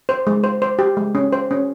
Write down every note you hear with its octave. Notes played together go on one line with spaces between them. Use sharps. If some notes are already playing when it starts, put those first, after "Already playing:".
C5
G#3
C5
C5
G4
G#3
C#4
C5
C#4